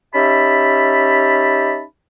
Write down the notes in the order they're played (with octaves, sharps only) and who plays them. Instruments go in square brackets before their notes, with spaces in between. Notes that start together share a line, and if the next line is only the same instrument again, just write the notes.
[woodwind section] C#4 D#4 G4 E5 A5 B5